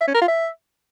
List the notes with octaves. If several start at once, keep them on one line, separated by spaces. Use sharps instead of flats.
E5
C#4
A#4
F4
E5